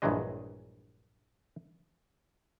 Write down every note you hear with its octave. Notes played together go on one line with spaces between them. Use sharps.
A#1 G2 E3 F#3 G#3 D#5